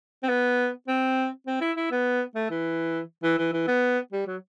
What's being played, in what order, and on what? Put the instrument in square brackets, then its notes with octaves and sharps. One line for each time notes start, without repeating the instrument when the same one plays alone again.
[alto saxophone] C4
B3
C4
C4
E4
E4
B3
A3
E3
E3
E3
E3
B3
G3
F#3